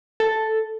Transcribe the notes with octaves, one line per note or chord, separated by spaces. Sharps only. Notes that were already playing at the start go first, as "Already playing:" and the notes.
A4